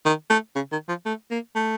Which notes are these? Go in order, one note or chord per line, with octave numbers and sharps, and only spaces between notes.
D#3
A3
C#3
D#3
F3
A3
A#3
A3